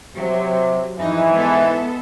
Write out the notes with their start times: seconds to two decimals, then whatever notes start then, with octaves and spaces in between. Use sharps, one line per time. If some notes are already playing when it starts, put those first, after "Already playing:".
0.16 C3 F#3
0.98 F2 G#2 E3 D#4
1.32 G#3 B3 A4